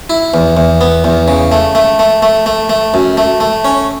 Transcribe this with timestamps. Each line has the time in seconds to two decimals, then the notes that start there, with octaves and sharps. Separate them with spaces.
0.10 E4
0.34 E2
0.57 E2
0.81 B3
1.04 E2
1.28 C#3
1.52 A3
1.75 A3
1.99 A3
2.23 A3
2.46 A3
2.70 A3
2.94 F#2
3.17 A3
3.40 A3
3.65 C#4